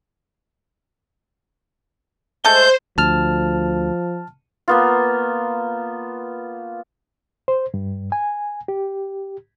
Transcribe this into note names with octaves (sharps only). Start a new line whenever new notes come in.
G#3 A3 A4 C5 G6
D2 F3 A5 F6
A#3 B3 F4
C5
G2
G#5
G4